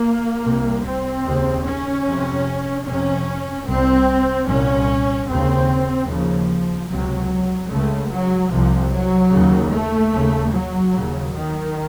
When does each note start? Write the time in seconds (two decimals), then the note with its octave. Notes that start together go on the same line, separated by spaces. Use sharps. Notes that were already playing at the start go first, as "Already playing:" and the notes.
Already playing: A#3
0.45 C2 C3
0.86 C4
1.27 D#2 C#3
1.67 C#4
2.07 F2 C3
2.87 F2 C3 C#4
3.68 C2 C3 C4
4.49 C2 A#2 C#4
5.29 D#2 C#3 C4
6.10 D#2 C#3 F3
6.91 C#2 C3 F#3
7.71 C#2 C#3 A3
8.12 F#3
8.52 C2 C3 F3
8.92 F#3
9.33 D#2 C#3
9.73 A3
10.13 D#2 C#3
10.53 F#3
10.94 D#2 C#3
11.35 D#3